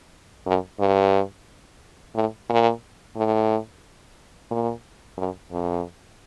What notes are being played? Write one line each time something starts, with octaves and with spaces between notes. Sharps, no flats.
F#2
G2
A2
A#2
A2
A#2
F#2
F2